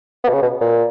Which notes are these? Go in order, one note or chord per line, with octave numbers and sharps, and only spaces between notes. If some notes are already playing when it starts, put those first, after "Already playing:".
B3
B2
C#3
B2
A#2